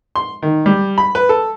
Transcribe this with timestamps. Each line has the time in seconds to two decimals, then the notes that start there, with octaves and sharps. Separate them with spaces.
0.16 C6
0.43 D#3
0.66 G3
0.98 B5
1.15 B4
1.29 A4